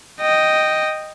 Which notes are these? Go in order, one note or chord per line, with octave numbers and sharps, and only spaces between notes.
D#5 G5